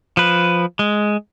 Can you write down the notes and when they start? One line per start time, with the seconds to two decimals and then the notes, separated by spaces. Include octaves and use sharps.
0.17 F3 B4
0.79 G#3